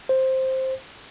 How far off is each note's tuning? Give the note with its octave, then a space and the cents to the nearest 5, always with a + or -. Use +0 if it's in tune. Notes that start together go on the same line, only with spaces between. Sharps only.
C5 +5